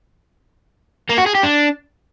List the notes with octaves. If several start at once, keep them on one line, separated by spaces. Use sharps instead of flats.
A#3
F#4
G#4
G4
D4